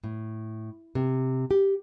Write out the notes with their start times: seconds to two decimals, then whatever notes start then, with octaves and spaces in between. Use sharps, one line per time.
0.04 A2
0.95 C3
1.51 G4